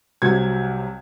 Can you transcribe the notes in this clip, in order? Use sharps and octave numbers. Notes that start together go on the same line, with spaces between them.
C2 C3 F#3 G#6